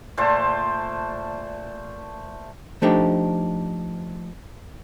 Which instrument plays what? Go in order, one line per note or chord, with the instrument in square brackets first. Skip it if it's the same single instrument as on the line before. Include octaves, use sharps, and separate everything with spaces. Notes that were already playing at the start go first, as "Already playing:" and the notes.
[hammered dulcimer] A#2 A3 C5 A5
[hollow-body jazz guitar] F3 A3 D4 D#4 G4